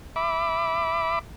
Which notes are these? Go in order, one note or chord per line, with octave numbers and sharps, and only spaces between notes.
E5 B5 D6